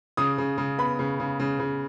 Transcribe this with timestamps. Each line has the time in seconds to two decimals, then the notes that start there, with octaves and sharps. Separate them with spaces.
0.17 C#3 D#6
0.38 C#3
0.58 C#3
0.78 B3 B5
0.99 C#3
1.20 C#3
1.40 C#3
1.60 C#3